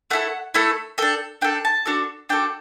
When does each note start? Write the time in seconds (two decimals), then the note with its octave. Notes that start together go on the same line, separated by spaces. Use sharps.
0.10 A3 E4 A4 F#5
0.54 A3 E4 A4
0.98 D4 A4 G5
1.41 D4 A4 G5
1.65 A5
1.85 D4 F#4 A4
2.29 D4 F#4 A4 G5